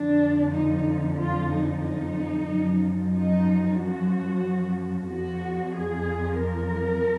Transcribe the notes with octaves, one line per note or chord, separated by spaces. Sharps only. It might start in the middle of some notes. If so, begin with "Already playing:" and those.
Already playing: F2 D3 F3 D4
D#4
F4
D#4
D#4
F#2 F3
D#4
F#4
F2 F3 F#4
G#4
A#4